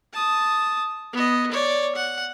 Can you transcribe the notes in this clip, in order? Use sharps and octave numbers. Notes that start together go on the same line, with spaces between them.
A5 D#6
B3 D#5
C#5 D5
F#5